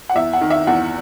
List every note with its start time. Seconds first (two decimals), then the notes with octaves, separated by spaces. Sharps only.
0.09 F#5
0.15 E2 E5
0.33 F#5
0.41 D#3
0.50 E5
0.67 E2 F#5